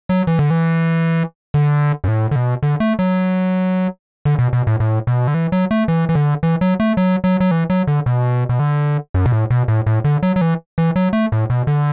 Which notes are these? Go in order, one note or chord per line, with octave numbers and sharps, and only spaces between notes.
F#3
E3
D3
E3
D3
F#2
A2
D3
B2
D3
A3
F#3
D3
B2
B2
A2
A2
B2
D3
E3
F#3
A3
E3
E3
D3
E3
F#3
A3
F#3
F#3
F#3
E3
F#3
D3
B2
B2
D3
F#2
B2
A2
B2
A2
A2
D3
F#3
F#3
E3
E3
F#3
A3
A2
B2
D3